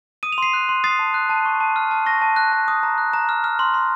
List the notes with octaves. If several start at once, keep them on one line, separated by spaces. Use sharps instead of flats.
D#6 D#7
F7
C6 C7 D#7
F#6
C6
D#6 A6 C7
A5
F#6
A5
C#6
A5
F6
A5
C#6 A#6
A5
F#6
A5
D#6
A#5
F#6
A#5
F6
F6
C6
C6